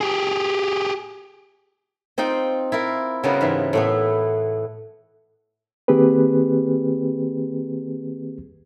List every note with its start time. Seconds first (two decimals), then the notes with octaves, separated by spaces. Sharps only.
0.01 G4 G#4
2.18 C4 D#4 F4 G5
2.72 E4 F4 A#4
3.24 C#3 G3 B3 F4 F#4 A#4
3.41 G#2 E3
3.73 A2 A3 B3
5.88 D#3 A#3 C4 G4 G#4 B4